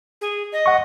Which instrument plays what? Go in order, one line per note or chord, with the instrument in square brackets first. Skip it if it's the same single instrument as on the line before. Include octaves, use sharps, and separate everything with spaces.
[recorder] G#4
D#5
[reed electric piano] F#5 C#6